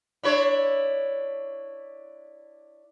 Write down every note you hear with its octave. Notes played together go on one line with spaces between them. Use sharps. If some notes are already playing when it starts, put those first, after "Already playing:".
D4 E4 C#5